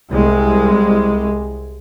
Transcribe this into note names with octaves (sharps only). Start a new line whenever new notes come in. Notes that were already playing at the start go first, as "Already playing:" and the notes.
C2 G#3